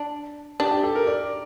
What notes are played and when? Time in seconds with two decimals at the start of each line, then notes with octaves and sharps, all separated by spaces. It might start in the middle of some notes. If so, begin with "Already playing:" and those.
Already playing: D4
0.60 D4 G4
0.71 G4
0.84 A4
0.95 A#4
1.07 D5